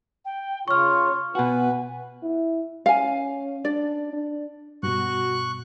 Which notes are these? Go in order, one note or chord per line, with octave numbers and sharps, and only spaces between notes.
G5
C#3 F4 C#5 C#6 F6
B2 F#4 B4 G#5
E4
C#4 F5 G#5
D4 D5
D4
G2 B2 F#4 C#6 F#6